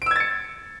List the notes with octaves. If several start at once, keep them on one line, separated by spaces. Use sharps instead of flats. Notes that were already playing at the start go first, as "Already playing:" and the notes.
E6 G#6 A6 C#7 D7